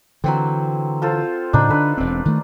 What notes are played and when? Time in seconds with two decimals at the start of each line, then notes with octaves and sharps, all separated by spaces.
0.24 D3 E3 F#3 C4
1.02 F4 A4 C5
1.53 A2 C#3 D4 D#4 B5
1.69 D3 D4 A4 B4
1.97 E1 C4
2.25 D#3 A3